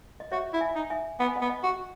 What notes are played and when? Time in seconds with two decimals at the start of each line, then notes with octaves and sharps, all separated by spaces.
0.20 D#5
0.32 F#4 C#5 E5
0.53 E4
0.61 E5 G#5
0.75 D#4
0.90 E5 G#5
1.20 B3 F#5
1.28 G#5
1.36 D#5 F#5
1.41 B3
1.49 D#5 F#5
1.63 F#4